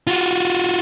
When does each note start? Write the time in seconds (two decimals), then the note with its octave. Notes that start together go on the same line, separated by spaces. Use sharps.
0.07 F4 F#4